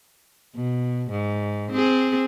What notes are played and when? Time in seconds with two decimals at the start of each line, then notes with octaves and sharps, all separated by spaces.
0.55 B2
1.11 G#2
1.72 C4 G#4